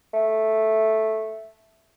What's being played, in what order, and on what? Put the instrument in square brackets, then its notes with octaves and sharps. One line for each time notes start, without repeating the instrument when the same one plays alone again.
[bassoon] A3